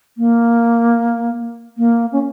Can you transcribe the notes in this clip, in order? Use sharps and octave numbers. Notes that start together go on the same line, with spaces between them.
A#3
A#3
C#4